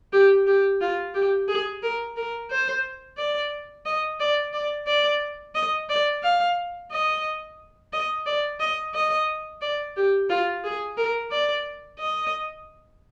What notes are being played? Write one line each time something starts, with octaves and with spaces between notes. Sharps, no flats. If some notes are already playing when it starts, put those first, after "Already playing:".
G4
G4
F4
G4
G#4
A#4
A#4
C5
D5
D#5
D5
D5
D5
D#5
D5
F5
D#5
D#5
D5
D#5
D#5
D5
G4
F4
G#4
A#4
D5
D#5